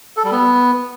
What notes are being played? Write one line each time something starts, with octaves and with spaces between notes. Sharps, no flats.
A4
G3
B3